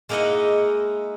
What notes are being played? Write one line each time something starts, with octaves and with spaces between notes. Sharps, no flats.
G#3 A#3 D#4 E4 D#5 F#5